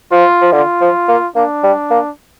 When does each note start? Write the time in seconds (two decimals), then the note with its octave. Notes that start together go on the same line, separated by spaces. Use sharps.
0.11 F3 F4
0.42 F3
0.53 D3 F4
0.81 F3
1.08 A#3
1.36 A#3 D4
1.63 G3
1.91 A#3